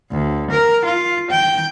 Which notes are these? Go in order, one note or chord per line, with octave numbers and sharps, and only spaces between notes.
D2
A#4
F4
G5